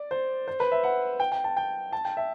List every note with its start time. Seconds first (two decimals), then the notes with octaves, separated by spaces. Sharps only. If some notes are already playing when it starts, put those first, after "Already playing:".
Already playing: D5
0.11 C5
0.47 C5
0.60 B4
0.72 E5
0.84 F#5
1.20 G5
1.32 G5
1.44 A5
1.57 G5
1.93 A5
2.05 G5
2.17 E5